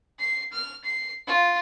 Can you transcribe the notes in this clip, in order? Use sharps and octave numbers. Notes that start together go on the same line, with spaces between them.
C7
F6
C7
F4